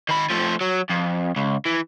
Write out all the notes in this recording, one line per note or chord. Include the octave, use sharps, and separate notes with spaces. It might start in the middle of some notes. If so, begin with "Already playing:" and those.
D#3 B5
F3 A3
F#3
F2
C#2
E3